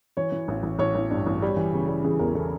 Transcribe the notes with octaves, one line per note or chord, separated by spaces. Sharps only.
E3 C#5
E3
A1
A1
A1 C#5
A1
G2
A1
G3
E3
C#3
G3
E3 G#4
E2 A#4
E3 A4